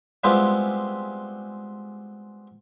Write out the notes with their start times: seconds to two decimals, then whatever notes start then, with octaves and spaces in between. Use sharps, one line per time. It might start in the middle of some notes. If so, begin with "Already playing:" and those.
0.24 G3 G#3 B3 C4 E4 F4